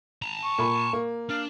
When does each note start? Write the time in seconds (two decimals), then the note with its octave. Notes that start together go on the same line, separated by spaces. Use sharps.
0.22 A5 A#5
0.44 C#6
0.59 A#2 B5
0.93 A#3
1.29 D4 F5